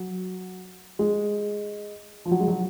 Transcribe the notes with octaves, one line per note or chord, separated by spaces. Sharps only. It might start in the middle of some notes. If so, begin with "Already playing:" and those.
Already playing: F#3
G#3
F3
F#3
G#3
F#3